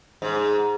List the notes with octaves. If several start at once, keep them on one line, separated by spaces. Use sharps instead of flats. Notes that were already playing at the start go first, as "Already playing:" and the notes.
G#2